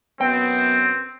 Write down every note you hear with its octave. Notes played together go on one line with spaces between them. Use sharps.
F#2 B3 C4 G5